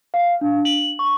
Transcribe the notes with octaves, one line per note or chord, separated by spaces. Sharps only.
F5
D4
F#7
C#6